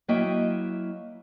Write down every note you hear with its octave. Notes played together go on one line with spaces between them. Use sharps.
F#3 A#3 E4 D#5 E5 G5